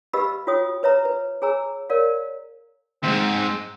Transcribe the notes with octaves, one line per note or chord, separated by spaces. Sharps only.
G4 B4 D#5 F5 B5 E6
F4 F#4 C#5 G5 D#6
B4 C#5 E5 A#5
B4
G#4 C#5 G#5 A#5 E6
A#4 C#5 D5 F5
D2 G#2 C4